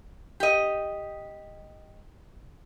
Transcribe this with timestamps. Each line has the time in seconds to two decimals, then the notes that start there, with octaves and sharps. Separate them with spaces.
0.40 G4 D#5